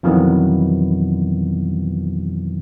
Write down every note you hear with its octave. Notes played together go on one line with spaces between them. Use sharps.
F2 B2 D#3 E3 F#3 B3